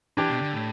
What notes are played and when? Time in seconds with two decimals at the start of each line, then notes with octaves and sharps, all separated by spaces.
0.17 E3 D4 G4
0.29 B2
0.42 D3
0.53 A2